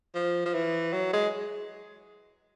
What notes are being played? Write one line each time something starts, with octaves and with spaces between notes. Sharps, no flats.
F3
F3
E3
F#3
G#3